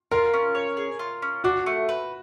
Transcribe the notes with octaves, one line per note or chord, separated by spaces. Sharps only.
F4 A#4
C#4
C#5
G#4
F4
C#4
D4 F#4
A3
B4